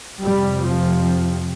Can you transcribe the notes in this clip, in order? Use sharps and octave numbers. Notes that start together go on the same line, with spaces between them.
F2 C3 G3
F3